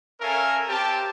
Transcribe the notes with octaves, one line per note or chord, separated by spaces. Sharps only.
C#4 A4 A#4 E5 F5 G#5
C4 G4 A5